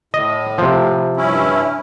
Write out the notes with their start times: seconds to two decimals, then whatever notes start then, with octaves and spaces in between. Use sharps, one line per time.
0.14 A2 D#5
0.58 C3 F3
1.17 G2 C#4 E4